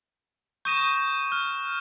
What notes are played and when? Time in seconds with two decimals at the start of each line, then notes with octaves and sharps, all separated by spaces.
0.65 C#6 D#6 G6 A#6 D#7 E7
1.32 F6 F#6